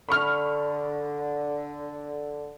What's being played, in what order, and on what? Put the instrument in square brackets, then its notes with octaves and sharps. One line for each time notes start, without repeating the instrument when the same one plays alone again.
[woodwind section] D3 [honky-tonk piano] B5 C#6 F6